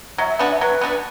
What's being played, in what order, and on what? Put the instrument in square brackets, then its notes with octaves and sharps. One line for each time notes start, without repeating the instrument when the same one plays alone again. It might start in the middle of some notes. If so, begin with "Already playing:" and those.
[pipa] F#3 [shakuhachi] E5
[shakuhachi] E5
[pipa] B3 D4 F#4 [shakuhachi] F#5
[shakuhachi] E5
[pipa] F#3 [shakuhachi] B4
[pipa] B3 D4 F#4